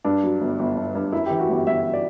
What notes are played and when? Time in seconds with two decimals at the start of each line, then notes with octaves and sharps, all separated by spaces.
0.04 G2 D4
0.23 F#3
0.41 G1
0.59 G1
0.77 G1
0.95 G2
1.12 F#2 E4
1.26 E3 G4
1.40 F#4
1.49 G1 G4
1.67 G1 E5
1.93 D5